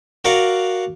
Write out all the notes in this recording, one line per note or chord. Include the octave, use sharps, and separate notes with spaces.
F#4 A#4 D5 F5 F#5